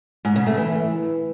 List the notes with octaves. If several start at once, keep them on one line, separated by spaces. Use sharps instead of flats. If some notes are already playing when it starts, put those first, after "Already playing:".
G#2
C#3
A3
E3